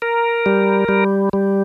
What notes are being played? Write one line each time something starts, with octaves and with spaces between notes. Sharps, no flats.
A#4
G3
G3
G3